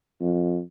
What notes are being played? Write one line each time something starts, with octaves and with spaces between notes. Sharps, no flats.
F2